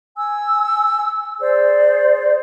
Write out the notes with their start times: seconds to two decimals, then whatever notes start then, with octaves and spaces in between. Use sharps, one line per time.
0.16 G#5 E6
1.39 G#4 C5 D5